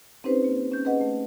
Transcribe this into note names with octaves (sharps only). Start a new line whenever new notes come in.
C4 C#4 D#4 G4 B4 C5
A#3
C#4 G6
C#4 G#4 B4 D#5 F#5
A3